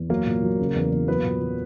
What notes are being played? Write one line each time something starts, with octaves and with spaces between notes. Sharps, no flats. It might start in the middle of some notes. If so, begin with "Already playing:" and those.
Already playing: E2
F#3 A#3 A#4
A#2
F#3
C#3
E2
E2
F#3 B3 B4
A#2
F#3